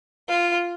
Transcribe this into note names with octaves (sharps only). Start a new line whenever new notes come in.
F4